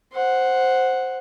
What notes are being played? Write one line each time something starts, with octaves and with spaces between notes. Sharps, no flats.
C5 F#5